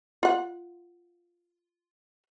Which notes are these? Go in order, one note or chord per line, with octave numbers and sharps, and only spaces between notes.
F4 F#5